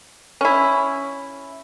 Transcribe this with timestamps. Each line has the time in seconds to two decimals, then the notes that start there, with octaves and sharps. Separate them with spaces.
0.41 C#4 E4